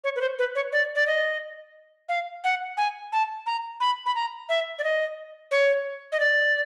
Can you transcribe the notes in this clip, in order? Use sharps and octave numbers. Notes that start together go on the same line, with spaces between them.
C#5
B4
C5
B4
C#5
D5
D5
D#5
F5
F#5
G#5
A5
A#5
B5
B5
A#5
E5
D5
D#5
C#5
D#5
D5